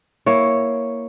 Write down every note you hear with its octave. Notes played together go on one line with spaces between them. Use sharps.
A#3 E4 C#5